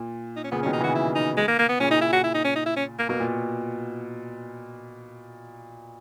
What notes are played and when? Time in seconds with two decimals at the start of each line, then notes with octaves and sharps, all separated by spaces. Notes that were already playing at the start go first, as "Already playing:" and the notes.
Already playing: A#2
0.36 D#4
0.44 C#4
0.51 A#2 C#3 B3
0.63 C#4
0.65 B2 D#3
0.73 D#4
0.80 C#3 E3 F#4
0.95 E4
1.15 D#4
1.37 G#3
1.48 A#3
1.59 A#3
1.69 B3
1.80 A#2 C#3 C#4
1.91 D#4
2.01 E4
2.12 F#4
2.24 E4
2.34 D#4
2.44 C#4
2.56 D#4
2.66 E4
2.76 C#4
2.99 A#3
3.09 B2 A#3
3.20 A#2